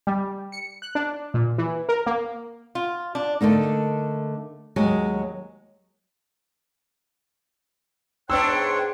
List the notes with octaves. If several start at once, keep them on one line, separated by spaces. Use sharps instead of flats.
G3
C#7
F#6
D4
A#2
E3
A#4
A#3
F4
D4
D3 A3 A#3 D#4
D#2 F#3 G#3
G#2 B3 D4 C#5 G5 C6 E6 F#6